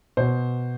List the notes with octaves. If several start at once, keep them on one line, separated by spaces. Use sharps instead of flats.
B2 C5